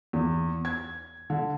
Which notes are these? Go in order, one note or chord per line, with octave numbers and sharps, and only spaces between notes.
E2
G#6
D3